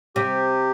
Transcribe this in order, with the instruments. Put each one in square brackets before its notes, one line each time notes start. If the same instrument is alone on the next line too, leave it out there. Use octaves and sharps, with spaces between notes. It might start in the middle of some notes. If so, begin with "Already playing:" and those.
[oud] C3 [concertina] G4